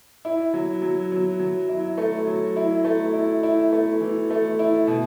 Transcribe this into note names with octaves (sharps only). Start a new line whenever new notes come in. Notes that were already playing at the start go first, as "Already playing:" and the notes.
E4
F#3
F#3
F#3
F#3
E4
A3
F#3
E4
A3
E4
E4
A3
E3
A3
E4
B2